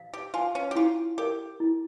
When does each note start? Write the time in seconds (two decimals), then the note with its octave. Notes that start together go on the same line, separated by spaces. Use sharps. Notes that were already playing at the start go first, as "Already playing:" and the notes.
Already playing: F5
0.13 G4
0.34 F4 G#5
0.55 C#4
0.71 G4
0.76 E4 F4
1.18 G4 A#4
1.60 E4